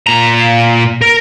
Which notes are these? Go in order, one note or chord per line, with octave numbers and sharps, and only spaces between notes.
A#2 A#5
A#4